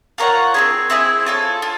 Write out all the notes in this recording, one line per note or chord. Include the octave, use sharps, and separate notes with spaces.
F4 A#4 C#5 F#5
C4 E4 G#4
C4 E4 G#4
F4 A4 C#5
F4